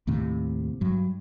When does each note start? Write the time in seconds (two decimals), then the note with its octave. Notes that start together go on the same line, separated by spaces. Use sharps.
0.07 D#2 A2 C3
0.81 G2 F#3